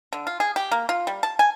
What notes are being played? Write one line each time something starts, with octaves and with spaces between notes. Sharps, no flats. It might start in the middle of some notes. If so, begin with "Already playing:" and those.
D3
F4
G#4
G4
A#3
F4
G3
A5
G#5